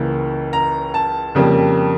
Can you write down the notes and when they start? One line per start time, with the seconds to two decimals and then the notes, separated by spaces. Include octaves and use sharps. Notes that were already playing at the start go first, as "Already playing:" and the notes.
Already playing: C#2 C#3 E3 A#3
0.53 A#5
0.94 A5
1.35 F2 C#3 G3 A#3